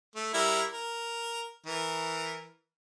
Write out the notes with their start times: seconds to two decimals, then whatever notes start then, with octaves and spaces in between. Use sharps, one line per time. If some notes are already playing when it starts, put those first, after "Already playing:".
0.15 A3
0.34 G3 E4 A#4
0.73 A#4
1.66 E3 A#4